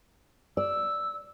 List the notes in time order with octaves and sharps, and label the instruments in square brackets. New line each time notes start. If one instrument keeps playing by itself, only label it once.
[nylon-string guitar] D5 [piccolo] E6